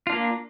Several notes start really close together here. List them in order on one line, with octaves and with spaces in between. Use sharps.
F4 D4 A#3